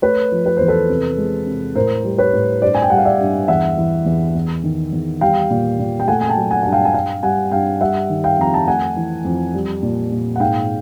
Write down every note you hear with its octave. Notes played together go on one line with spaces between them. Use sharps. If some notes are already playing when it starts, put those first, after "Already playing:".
A3 B4 C#5
F3
B4
E2 C5
A4 B4
C3
G#3
C3
A2 A#4 C5
G3
B4 C#5
A2
G2 C5 D5
G#5
G5
G3 F#5
F5
D5 E5
G2
E2 E5 F#5
E3
E2
E2
D#3
E2
G3 F5 G5
A#2
A#2
G5
A3 F#5 G#5
G#5
G5 A5
F#3
F#5 G#5
G2 F#5
F5 G5
G#5
G2 F5 G5
G3 F#5 G#5
G2 F5 G5
G3 E5 F#5
D#3
F5 G5
F2 A#5
A5
A3 F#5 G#5
E3
F2
G3
A#2
A#2
F#5
G#2 F5 G5